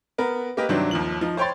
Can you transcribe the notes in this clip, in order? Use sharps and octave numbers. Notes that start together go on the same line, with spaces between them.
B3 A#4 B5
A#3 G4 A#4 B4 D#5
G2 C3 D#3 F#3 C4 D4
D#2 F3 F#7
F3 D#4
C5 C#5 G5 B5 C6 A6